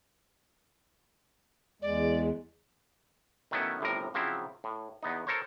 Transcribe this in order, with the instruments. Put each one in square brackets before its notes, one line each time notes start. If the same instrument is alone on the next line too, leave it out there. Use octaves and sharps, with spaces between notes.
[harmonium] E2 G#3 [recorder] D5
[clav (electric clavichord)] D#3 F#3 A3 B3 C#4 E4
G1 A2 C3 A#4
C#3 F3 F#3 C4 E4
A2
E2 B3 D#4
A4 A#4 C5 C#5